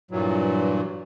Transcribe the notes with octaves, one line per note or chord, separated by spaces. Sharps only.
G2 A#2 E3 F#3